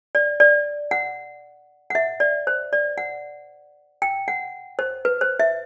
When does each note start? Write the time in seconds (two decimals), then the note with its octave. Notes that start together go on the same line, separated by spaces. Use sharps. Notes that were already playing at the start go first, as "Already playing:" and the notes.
0.15 D5
0.40 D5
0.91 F#5
1.90 F#5
1.95 E5
2.20 D5
2.47 C5
2.73 D5
2.98 F#5
4.02 G5
4.28 F#5
4.79 C5
5.05 B4
5.21 C5
5.40 E5